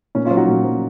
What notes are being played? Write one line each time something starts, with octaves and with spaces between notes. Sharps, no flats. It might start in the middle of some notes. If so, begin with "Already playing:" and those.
A#2 C#4
C#4 F4
F#3
D#4 F#4
A#2
F#3